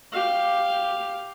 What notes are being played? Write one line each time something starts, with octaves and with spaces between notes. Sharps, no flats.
G4 F5